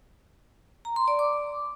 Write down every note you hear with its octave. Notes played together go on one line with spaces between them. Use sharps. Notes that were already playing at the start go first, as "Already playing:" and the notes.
A#5
C6
D5
D6